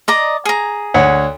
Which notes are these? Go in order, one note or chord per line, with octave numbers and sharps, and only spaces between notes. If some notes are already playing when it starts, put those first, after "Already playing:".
D5 D#5 A#5
G#4 A#5
D2 C#5 F#5